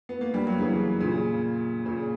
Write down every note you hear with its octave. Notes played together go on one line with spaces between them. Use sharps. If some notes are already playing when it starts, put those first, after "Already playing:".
B3
A#3
G3
F#3
C#3 E3
A#2 C#3
A#2 C#3